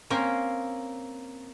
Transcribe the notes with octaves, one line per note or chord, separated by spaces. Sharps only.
A#3 C4 C#4 A#4